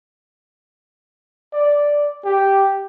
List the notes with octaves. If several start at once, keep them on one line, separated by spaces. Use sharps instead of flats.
D5
G4